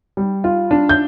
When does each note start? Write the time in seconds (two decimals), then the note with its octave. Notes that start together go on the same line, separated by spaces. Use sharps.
0.17 G3
0.44 F4
0.71 D4
0.89 G6